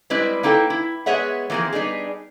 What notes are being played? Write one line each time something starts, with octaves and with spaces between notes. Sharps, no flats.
G3 G#3 C4 E4 B4
A#3 D#4 E4 A4 G5
E4
G#3 B3 G#4 C#5 E5 F#5
E3 F3 A#3 C4 G#4
G3 B3 D4 D#4 G#4